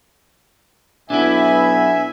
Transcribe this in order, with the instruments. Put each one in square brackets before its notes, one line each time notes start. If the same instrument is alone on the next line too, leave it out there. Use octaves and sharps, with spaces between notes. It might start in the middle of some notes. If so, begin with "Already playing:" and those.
[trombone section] B1 B3 [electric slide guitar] D4 E4 [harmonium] E5 G#5